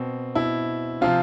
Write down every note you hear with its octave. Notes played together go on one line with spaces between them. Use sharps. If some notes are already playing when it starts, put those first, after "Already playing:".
Already playing: B2 C4
B2 E4
C3 F3 F4